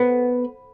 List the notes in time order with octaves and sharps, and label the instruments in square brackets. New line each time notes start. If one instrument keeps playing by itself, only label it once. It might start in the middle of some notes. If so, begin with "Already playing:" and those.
Already playing: [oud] B3